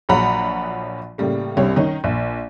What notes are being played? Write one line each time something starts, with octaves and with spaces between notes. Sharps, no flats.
A#1 F3 F#3 F#5 A#5 B5
A2 C#3 G3 A#3
C2 G3 C4 D4 C#5
D#3 C#4 D#4
A#1